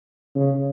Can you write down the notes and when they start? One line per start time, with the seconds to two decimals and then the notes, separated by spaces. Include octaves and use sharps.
0.35 C#3